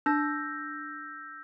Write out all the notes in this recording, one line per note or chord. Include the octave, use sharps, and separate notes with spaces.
D4 E6 G6 A#6